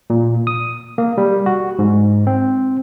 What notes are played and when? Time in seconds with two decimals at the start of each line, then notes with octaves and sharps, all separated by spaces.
0.10 A#2
0.47 D#6
0.98 A#3
1.18 G3
1.46 F#4
1.79 G#2
2.27 C4